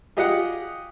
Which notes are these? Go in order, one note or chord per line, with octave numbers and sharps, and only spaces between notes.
F4 G4 G#4 D#5 F5 F#5